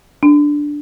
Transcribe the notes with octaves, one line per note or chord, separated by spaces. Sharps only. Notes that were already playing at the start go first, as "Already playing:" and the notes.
D4